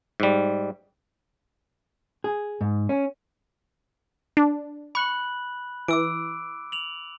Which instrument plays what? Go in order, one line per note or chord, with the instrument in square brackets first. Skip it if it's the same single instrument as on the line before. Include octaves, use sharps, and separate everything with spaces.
[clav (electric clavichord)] G#2 G3
[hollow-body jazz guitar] G#4
G#2
C#4
[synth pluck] D4
[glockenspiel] B5 F#6 F#7 [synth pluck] C#6
[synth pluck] E3 [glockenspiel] D6 E6 D7
[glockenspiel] F7 F#7